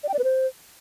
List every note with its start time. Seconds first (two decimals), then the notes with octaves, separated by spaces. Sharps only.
0.04 D5
0.09 G5
0.14 D5
0.19 B4
0.24 C5